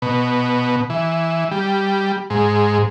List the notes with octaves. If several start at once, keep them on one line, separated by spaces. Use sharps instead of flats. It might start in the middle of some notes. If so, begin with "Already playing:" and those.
B2
E3
G3
G#2